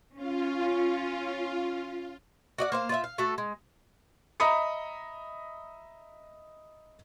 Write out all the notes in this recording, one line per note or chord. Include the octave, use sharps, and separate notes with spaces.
C#4 F4
F#4 D5 D#5 F#5
A#3 C5 F5
F4 C5 D5 E5
F5
A3 F#4 A4
G#3
D#5 E5 A#5 B5 D#6 C#7